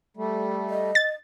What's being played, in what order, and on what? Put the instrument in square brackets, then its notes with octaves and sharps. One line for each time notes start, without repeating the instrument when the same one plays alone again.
[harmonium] G3 A3
[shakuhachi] D#5
[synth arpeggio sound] A6